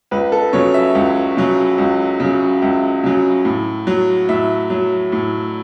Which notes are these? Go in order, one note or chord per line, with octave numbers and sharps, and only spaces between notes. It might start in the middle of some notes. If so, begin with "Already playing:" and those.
C#2 B4
A4
C#3 F#3 C#5
E5
C#2
C#3 F#3
C#2
C#3 F#3
C#2 E5
C#3 F#3
A2
F#3
A2 E5
F#3
A2